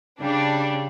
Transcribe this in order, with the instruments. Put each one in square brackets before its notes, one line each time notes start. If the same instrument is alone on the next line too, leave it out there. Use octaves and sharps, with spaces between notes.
[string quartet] C#3 G3 [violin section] D4